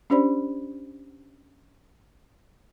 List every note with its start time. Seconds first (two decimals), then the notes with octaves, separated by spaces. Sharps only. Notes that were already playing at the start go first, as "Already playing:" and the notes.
0.10 C#4 D4 G4 C5 D5 B5